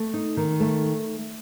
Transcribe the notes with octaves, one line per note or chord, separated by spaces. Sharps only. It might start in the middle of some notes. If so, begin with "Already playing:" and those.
Already playing: A3
D#4
D#3
A3